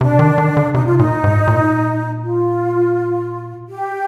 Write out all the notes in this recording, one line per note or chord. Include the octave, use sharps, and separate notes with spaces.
C3 D4
D#3
D#3
D3
C3 D#4
F4
A#2 D#4
G#2
A#2
F4
G4